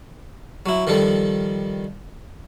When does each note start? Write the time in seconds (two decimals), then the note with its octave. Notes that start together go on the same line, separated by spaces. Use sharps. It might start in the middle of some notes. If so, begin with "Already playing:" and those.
0.66 F#3 E4
0.87 D#3 F3 G3 A4